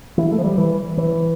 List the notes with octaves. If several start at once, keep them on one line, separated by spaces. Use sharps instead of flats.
E3
A3
F3
G3
E3
E3